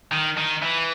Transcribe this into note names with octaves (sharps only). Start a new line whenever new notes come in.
D#3
D#3
E3